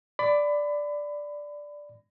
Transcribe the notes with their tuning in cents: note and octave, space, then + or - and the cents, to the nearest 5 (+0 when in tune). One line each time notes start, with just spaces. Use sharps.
D5 +0 B5 +30